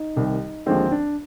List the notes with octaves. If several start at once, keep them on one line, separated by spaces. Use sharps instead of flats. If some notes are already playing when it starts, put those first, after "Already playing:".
Already playing: D#4
C2 C3 D#3 G3
D#2 D3 F3 G#3 C4
D4